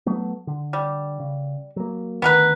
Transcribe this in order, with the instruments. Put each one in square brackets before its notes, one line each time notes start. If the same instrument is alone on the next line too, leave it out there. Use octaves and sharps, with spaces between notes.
[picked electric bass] F#3 A3 B3
D3
[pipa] G3
[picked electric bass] C#3
F#3 A#3
[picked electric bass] D2 D#3 [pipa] B3 A#4 B4